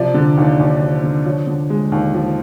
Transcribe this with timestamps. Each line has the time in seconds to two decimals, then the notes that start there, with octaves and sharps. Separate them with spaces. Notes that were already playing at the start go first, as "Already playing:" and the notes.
Already playing: C3 F3 D5
0.14 D3
0.37 D#2
0.59 D#2
0.81 F3
1.03 D3
1.25 F3 C#5
1.47 D3
1.70 G#3
1.92 D#2
2.14 F3